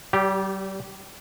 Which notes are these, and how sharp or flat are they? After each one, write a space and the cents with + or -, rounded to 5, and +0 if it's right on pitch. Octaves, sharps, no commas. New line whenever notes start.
G3 -35 G4 +0